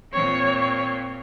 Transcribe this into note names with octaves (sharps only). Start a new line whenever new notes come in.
A#2 C4 C#5